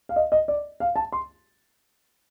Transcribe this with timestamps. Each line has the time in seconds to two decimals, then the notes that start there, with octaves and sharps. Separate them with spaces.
0.09 F5
0.16 D#5
0.32 D#5
0.48 D5
0.80 F5
0.96 A5
1.12 C6